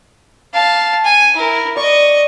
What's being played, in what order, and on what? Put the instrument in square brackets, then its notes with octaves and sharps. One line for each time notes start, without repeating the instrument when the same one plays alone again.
[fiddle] F5 A5
G#5
E4 A#4
[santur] D5 [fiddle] D#5 C#6